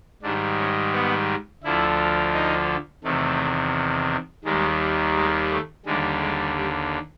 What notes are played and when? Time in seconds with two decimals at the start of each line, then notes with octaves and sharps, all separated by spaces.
0.23 G#2 D#3 G3 D4
0.58 C#4
0.93 B3
1.64 D2 D3 F3 E4
2.34 D#4
3.04 E2 C3 D#3 A3
4.44 D#2 D#3 G3 G#3
5.15 G#3
5.50 A3
5.86 D#2 D3 G3 G#3
6.20 G#3
6.56 G3